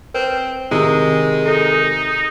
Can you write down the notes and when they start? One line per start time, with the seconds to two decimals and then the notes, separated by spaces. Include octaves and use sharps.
0.14 C4 B4
0.71 C3 D#3 G#3 E4 D#6 E6
1.46 D#4 A4